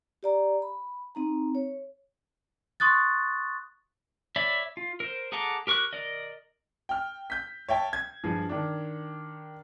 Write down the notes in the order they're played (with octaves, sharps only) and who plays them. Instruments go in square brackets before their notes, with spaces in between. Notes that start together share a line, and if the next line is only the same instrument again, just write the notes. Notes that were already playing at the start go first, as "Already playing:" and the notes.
[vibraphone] G4 D5 A#5
B5
C4 D#4 A#5
C#5
[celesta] C6 C#6 D#6 F#6 A6
[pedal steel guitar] C#5 D5 E5 B5
F4
A#4 C5
G#4 A4 F#5 A#5 D6
G4 A#4 C#6 D6 F#6
A#4 D5 D#5
[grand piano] G5 F6
G6 B6
C#5 E5 G5 A5
G#6
G2 F3 G#4
D#3 D4